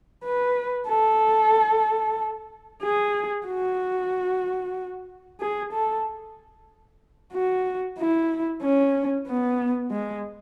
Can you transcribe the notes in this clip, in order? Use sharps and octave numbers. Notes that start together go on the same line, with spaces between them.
B4
A4
G#4
F#4
G#4
A4
F#4
E4
C#4
B3
G#3